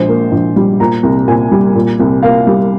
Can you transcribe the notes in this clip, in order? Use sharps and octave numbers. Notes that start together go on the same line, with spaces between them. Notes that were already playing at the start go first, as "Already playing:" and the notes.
Already playing: A#1 G#3 C5
A#3
A#1
G3
A#2 A#5
C2
A#2 G#5
G3
A#2
C2
A#3 F5
G3